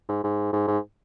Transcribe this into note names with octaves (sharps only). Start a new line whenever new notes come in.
G#2
G#2
G#2
G#2